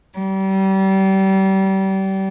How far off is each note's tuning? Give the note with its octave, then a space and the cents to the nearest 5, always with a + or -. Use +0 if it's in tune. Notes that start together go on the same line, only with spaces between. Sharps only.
G3 -30